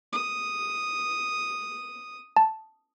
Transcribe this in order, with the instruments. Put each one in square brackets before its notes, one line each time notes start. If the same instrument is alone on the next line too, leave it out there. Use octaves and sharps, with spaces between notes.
[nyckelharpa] D#6
[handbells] A5